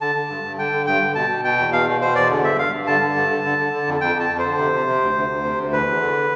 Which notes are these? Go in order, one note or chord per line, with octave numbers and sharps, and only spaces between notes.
D3 A5
D3
G2
G2
D3 G5
D3
G2 G5
D3
B2 A5
B2
B2 G5
E2
B2 F5
B2
B2 C5
E2 D5
D3
G2 E5
G2 F5
G2
D3 A5
D3
G2
D3
D3
D3
D3
F2
F2 G5
F2 A5
F2
D3 C5
C3
C3
C3
D2
D2
D2
C3
D2
E2 B4
E2
D3